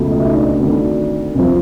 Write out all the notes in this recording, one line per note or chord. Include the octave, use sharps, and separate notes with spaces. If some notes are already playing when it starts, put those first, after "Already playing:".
Already playing: C#2 B2 F#3 A3
D#5
E5
D#4 D#5
D4 D5
D2 C3 D#3
C2 C3 F3